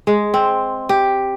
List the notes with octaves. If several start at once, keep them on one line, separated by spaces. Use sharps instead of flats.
G#3
C4
G4